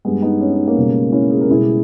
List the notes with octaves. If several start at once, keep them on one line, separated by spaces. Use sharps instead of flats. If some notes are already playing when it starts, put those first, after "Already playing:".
G2 G3 G#3 B3
B3 D#4
C#4
D#4
A#3 C#4
C#2 B2 G3
C#4 E4
G#4
A#4
C#2 B2 G3 E4 G#4